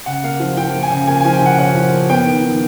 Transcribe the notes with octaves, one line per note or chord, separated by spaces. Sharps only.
C#3 F#5
A#3 F5
F3
F3 G5
A#3
G#5
C#3
A#3 G#5
G#5
F3
G5
C#3 F#5
C#4 F#5
F3
A#3
B3 G5
D#3
D#3